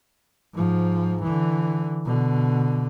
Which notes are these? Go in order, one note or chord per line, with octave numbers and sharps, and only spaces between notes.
G#2 F3
D3 E3
B2 D3